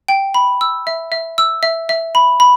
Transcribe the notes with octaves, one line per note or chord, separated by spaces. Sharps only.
G5
B5
E6
E5
E5
E6
E5
E5
B5
B5